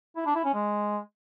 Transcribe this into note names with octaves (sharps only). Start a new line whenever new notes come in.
E4
D4
E4
C#4
G#3